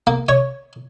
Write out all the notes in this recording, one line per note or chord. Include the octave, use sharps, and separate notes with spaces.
A#3
C#5